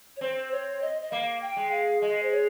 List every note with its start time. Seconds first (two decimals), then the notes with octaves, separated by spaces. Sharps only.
0.17 C#5
0.21 C4 C5
0.52 C#5
0.82 D#5
1.02 D#5
1.12 A#3 F5
1.42 G5
1.56 G#3
1.71 F5
2.02 G#3 D#5
2.23 C5
2.32 C#5